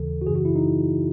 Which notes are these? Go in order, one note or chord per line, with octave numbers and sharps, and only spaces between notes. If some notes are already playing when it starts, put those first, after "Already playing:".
Already playing: D#2 C#3 E3 A4
F#4
F#2 C#3 E3 G#4
F#4
E4
D#4